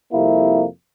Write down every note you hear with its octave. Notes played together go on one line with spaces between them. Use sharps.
F2 C3 G3 A#3 E4